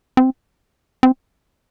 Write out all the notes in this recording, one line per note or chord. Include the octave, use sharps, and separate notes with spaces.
C4
C4